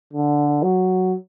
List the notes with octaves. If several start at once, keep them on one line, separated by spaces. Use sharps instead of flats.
D3
F#3